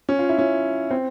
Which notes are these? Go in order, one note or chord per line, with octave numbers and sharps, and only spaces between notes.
C#4
F4
E4
C#4
C4